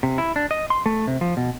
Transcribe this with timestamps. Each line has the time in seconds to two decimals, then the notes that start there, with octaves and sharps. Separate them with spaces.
0.03 C3
0.18 E4
0.36 D4
0.51 D#5
0.70 C6
0.86 A3
1.07 C3
1.21 F3
1.37 B2